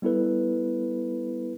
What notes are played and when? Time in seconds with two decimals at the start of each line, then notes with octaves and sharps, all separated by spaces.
0.02 G3 B3 E4 A4 B4